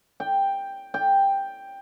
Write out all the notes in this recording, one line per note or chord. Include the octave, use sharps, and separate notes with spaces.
G5
G5